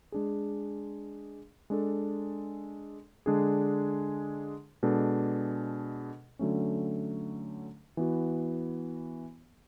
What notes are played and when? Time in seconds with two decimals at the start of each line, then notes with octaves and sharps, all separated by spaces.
0.12 G#3 D4 G#4
1.70 G#3 D4 A4
3.26 D3 G#3 D4 G#4
4.83 B2 G#3 D4 A4
6.39 D3 F#3 A3 C#4
7.97 E3 B3 F#4